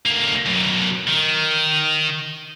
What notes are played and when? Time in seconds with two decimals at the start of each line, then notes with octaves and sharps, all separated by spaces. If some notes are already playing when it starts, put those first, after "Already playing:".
0.06 D2 A#3
0.46 F#2 B2
1.07 D#3